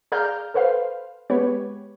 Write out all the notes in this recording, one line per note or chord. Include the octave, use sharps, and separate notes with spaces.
G#4 D5 F5 A#5 F6 G6
A4 B4 C5 F5
G#3 B3 G4 B4 C#5